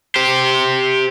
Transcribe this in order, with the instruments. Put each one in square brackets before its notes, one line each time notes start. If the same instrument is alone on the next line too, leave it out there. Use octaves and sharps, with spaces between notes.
[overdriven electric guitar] G4 C5